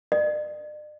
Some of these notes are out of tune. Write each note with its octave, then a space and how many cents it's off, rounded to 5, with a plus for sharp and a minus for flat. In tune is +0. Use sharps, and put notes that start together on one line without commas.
D5 +40